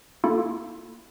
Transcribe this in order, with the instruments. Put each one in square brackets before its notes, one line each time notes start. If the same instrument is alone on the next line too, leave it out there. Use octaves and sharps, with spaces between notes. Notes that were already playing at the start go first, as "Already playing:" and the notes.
[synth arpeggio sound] A#3 E4 F4 A4